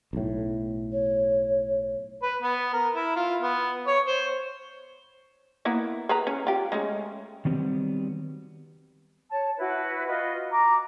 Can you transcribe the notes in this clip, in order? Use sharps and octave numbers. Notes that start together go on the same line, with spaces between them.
B1 A2
C#5
B4
B3
A#4
E4
F4
B3
C#5
C5
A#3 B3 E4
G#4 B4 A#5
C#4
F4 G4
G#3 A3 C#4
D#3 F#3 G3 B3 C4
C#5 A5
E4 F#4 B4
F4 F#4 B4 D#5
A#5 D6